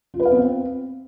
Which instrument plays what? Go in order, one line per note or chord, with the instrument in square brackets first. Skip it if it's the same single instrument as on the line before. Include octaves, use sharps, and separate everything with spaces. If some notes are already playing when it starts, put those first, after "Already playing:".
[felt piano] F4
B4
F5
B3
C4